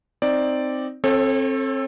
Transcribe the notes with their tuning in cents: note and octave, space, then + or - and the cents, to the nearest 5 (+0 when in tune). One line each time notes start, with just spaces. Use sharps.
C4 +0 D#4 +0 D5 +0
C4 +25 A4 +0 C#5 -35